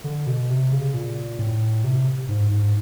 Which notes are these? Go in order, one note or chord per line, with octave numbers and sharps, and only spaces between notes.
D3
B2
C3
C#3
A#2
A2
C3
G#2
G#2